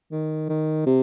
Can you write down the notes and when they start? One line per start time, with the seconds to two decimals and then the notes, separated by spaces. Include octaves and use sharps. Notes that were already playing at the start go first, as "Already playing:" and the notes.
0.12 D#3
0.49 D#3
0.86 C3